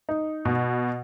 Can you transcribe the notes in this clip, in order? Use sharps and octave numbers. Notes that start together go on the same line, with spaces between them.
D#4
B2